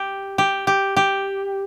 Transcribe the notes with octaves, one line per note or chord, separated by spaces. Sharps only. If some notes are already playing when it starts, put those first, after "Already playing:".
Already playing: G4
G4
G4
G4